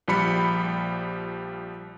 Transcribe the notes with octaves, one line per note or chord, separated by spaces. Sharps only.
A#1 F3 G3 B5 C#7